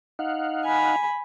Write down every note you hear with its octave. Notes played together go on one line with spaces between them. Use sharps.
D#4 F5 F#5
G#5 B5